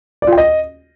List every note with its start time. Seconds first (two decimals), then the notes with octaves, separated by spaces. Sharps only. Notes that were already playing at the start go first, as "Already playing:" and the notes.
0.22 D5
0.27 F4
0.32 G5
0.38 D#5